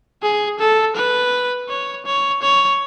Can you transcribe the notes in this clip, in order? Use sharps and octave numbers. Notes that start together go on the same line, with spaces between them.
G#4
A4
B4
C#5
C#5
C#5